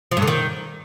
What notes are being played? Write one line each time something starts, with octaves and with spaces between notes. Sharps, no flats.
F3
G2
D3
D#3